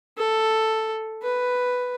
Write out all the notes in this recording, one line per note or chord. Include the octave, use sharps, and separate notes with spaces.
A4
B4